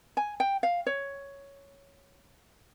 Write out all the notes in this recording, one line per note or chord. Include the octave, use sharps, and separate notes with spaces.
G#5
G5
F5
C#5